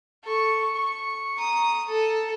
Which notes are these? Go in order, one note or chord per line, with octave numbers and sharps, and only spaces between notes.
A4 C#6
C#6
A#5 D#6
A4